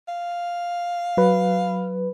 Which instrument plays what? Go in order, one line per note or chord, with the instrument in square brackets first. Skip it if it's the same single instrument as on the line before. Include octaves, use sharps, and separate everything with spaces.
[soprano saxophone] F5
[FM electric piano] F#3 B4